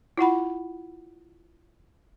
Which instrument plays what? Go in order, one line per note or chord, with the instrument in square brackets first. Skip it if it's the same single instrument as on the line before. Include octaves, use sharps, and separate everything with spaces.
[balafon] E4 F4 F#5 B5